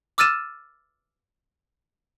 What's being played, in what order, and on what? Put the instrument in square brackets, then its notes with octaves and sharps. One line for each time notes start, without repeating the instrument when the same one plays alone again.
[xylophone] D6 E6 F6 A6 D#7 E7